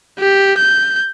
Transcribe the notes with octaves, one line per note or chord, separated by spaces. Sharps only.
G4
G6